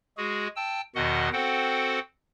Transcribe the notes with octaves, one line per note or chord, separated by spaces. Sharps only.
G#3 F#4 G#4
G5 A5 E6
E2 B2 D#3 F#4 D#5 F#5
C4 F#4 A4 C5 F#5 G5